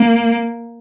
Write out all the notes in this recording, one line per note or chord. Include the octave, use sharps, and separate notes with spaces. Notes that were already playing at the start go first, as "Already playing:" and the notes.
Already playing: A#3